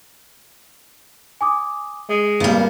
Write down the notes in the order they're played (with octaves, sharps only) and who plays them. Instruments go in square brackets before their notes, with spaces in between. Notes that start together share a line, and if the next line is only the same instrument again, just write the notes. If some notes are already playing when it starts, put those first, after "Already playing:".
[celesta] G#5 D6 D#6
[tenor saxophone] G#3 [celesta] D#5
[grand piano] G#1 G3 [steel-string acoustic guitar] A#3 B3